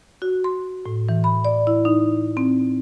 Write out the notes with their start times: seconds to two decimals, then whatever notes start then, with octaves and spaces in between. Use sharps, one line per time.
0.22 F#4
0.44 C6
0.86 A2
1.09 E3
1.24 B5
1.45 D5
1.67 E4
1.85 D#4
2.37 C4